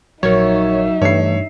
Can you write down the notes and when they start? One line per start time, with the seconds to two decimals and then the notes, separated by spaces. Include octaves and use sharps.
0.23 A#1 F#3 D#4 A#4 C#5 E5
1.02 G2 E3 A3 C#5 C7